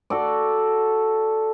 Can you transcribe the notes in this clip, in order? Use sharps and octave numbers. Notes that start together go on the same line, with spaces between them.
F#4 A4 D5